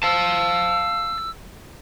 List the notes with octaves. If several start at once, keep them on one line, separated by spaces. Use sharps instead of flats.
F5 A5 E6